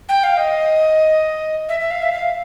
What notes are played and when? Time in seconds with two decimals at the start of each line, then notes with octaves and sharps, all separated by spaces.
0.09 G5
0.23 F5
0.37 D#5
1.69 E5
1.80 E5
1.91 F5
2.02 E5
2.13 F5